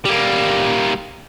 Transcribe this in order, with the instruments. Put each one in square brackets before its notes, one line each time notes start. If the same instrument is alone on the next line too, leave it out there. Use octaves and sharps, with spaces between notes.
[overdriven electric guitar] G3 A#3